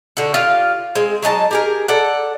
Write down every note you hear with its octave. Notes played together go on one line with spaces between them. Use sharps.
D3 F#4
F4 G4 F5
G#3 C4
F#3 G#3 D#4 A5
G4 G#4 A#4
A4 D5 F#5